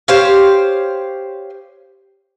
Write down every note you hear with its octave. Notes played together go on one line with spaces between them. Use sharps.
G4 C5 C#5 F5